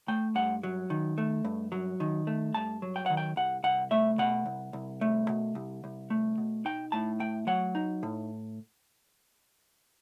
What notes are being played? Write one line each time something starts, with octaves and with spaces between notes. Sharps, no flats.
A3 G5
G2 F#5
F#3
D#3
A3
G2
F#3
D#3
A3
G2 A5
F#3
G5
D#3 F#5
G5
C2 F#5
C2 F#5
A3 E5
B2 F#5
C2
C2
A3
B2
C2
C2
A3
B2
D#4 G5
A2 A5
A3 G5
F#3 F#5
D#4
A2